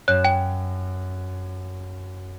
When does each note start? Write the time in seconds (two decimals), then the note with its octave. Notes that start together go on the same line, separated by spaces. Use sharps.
0.08 F#2 C#5 F#6 E7
0.24 G5